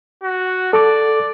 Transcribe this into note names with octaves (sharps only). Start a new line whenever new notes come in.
F#4
A4 D5 D6